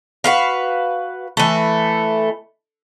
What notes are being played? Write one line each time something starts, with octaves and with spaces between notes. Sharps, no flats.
F#4 B4 F5
E3 A3